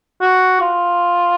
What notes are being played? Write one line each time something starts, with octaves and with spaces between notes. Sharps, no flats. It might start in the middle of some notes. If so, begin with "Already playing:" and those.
F#4
F4